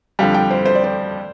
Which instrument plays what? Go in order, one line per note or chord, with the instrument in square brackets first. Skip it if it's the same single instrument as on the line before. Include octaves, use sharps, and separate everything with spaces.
[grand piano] F2 D3 G3 [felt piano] F5
[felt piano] G5
C5
C5
D5
C5